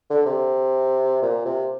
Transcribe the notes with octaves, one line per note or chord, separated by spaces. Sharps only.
D3
C3
A#2
C3